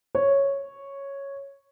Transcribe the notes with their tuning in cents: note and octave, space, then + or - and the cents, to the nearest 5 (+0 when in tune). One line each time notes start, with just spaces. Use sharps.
C#5 -5